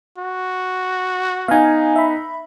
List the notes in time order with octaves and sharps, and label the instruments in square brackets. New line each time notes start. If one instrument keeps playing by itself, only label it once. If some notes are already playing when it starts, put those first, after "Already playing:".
[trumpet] F#4
[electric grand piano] B3 D#4 [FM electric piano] F5 G#5
[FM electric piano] E5 B5